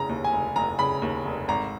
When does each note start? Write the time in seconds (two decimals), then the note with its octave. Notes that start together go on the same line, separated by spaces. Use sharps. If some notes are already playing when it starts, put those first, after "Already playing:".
Already playing: F1 C#3 A#5
0.09 D#2
0.24 G#5
0.32 F1
0.56 F1 A#5
0.79 C#3 B5
1.02 D#2
1.25 F1
1.48 G#1 A#5